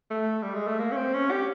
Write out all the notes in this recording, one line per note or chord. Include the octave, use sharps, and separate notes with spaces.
A3
G3
G#3
A3
A#3
C#4
C4
C#4
G4